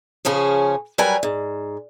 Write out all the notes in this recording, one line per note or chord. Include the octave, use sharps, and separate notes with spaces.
C#3 F3 C#4 G#4
F#3 G3 A#4 B4 G#5
G#2